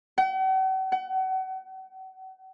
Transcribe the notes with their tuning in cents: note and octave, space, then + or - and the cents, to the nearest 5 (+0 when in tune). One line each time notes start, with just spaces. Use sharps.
F#5 +45
F#5 +35